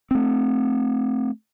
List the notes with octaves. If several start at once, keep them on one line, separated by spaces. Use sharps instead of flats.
A3 C4